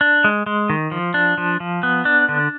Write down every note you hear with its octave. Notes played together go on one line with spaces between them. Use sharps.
D4
G#3
G#3
D#3
F3
D4
F3
F3
B3
D4
D3